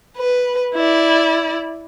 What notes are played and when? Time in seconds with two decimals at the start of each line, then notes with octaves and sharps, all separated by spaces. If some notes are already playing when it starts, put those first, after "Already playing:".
0.17 B4
0.75 E4 D5